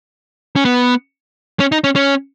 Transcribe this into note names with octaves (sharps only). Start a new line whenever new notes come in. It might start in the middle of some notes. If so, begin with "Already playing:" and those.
C#4
B3
C#4
D#4
C#4
C#4